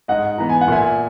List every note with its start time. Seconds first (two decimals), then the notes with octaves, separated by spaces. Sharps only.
0.08 G#2 D#5 F#5
0.38 E3 B3 A#5
0.49 G#5
0.61 F#5
0.68 A#2 E5 G#5